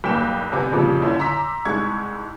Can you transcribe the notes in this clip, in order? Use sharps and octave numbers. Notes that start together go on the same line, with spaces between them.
B1 G2 A#3 G5 G6 E7
G1 C3 B3 C5 G#5 D6
F2 A#2 C#3 F3 G3
D3 C#4 E4 G6
A#5 C6 D6 E6 B6
C2 G#2 G#3 C#6 G#6